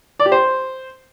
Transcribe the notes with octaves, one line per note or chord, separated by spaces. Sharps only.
D5
G4
C5